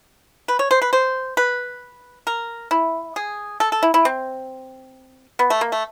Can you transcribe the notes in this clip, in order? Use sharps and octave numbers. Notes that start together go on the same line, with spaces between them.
B4
C#5
C5
B4
C5
B4
A#4
E4
G#4
A4
A4
E4
E4
C4
B3
A3
A#3
A3